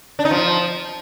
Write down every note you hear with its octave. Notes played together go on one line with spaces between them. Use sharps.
D4
D#4
F3